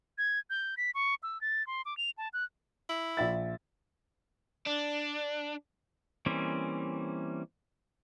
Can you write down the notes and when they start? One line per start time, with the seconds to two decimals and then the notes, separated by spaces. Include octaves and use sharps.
0.18 G#6
0.50 G6
0.77 B6
0.95 C#6
1.23 E6
1.41 A6
1.67 C6
1.86 D6
1.97 F7
2.18 A5
2.33 F#6
2.89 E4
3.17 A#1 E5 A6
4.66 D4
6.26 E3 G3 A#3 C4 C#4